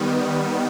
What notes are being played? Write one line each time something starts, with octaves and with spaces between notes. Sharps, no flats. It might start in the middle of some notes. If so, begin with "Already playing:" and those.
Already playing: D#3 G3 B3